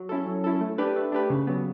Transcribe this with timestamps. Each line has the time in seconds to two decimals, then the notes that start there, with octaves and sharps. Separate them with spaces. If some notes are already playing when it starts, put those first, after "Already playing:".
Already playing: F#3
0.09 C#4 E4 A4
0.26 F#3
0.44 C#4 E4 A4
0.61 A3
0.78 D4 G4 B4
0.96 A3
1.12 D4 G4 B4
1.30 C#3
1.47 F#3 B3